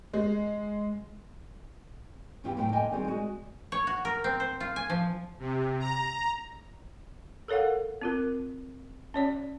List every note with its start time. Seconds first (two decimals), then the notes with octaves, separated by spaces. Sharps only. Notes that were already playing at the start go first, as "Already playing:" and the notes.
0.13 G#3
2.44 E2 G2 B3 E4 F4 G4
2.57 D2 A2 C3 F#3 F#5 G5
2.72 F2 D3 A#3 D#5 G5 G#5
2.91 D#3 G3 C4 F#4 G#4
3.08 G#3 F#4 G#4
3.72 C#5
3.87 F#4
4.05 A#4
4.24 C4
4.40 C5
4.60 F4
4.76 G#5
4.90 F3
5.40 C3
5.80 A#5
7.48 A4 A#4 C#5 F5 F#5
8.02 C4 F4 A#4
9.14 C#4 C#5 D5